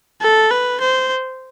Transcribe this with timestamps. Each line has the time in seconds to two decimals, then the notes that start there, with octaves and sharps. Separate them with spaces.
0.22 A4
0.51 B4
0.81 C5